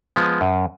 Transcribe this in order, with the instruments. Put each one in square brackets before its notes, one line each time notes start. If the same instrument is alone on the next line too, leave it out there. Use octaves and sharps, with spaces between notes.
[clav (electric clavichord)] F3 G#3 B3
F#2